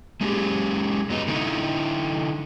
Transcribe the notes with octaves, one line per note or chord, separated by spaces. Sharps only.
G#3 A3 C#4 D#4 G4 G#4
F#2 F#3 B3 D#4
D3 A#3 C4 D#4 E4